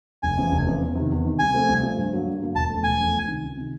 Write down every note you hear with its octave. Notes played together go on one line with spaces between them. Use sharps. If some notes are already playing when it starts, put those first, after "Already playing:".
F1 G#5
F2 C#3 E3
F1
F2 C#3 E3
E2
C3 D#3
E2
C3 D#3
C2 G#5
C3 F3 A3 C4
C2
C3 F3 A3 C4
G2
D3 F#3 A#3
G2
D3 F#3 A#3
E1 A5
E2 C#3 F3 A3
E1 G#5
E2 C#3 F3 A3
C#2
C3 D#3
C#2
C3 D#3